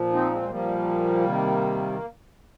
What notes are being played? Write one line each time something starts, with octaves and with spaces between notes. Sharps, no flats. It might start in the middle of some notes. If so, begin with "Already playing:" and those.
Already playing: A#2 F3
C4 D#4
G#3 C4
G#3
A#2 F3 G3 A#3
C3 D#3